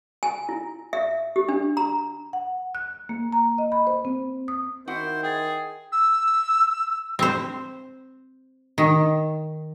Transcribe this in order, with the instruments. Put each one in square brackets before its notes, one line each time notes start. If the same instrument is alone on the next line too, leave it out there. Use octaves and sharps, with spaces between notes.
[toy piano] G#5
E4
E5
G4
D4
A#5
[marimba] F#5
F#6
A#3
A#5
D#5
B5
C5
C4
D#6
[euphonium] D#3 [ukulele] E4 F#4 F#5 [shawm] C5
[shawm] G#4 [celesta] G5 A6
[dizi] E6
[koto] C4 C5
D#3